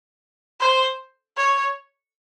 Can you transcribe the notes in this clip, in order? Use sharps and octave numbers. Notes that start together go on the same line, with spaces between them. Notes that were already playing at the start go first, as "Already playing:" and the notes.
C5
C#5